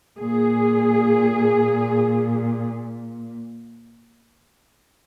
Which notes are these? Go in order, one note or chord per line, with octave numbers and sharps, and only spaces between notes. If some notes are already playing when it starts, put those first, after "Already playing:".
A#2 G#4